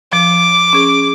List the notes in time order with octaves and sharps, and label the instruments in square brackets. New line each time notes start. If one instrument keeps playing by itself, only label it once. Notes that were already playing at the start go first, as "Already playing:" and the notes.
[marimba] F3 [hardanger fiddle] D6
[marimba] C#4 G#4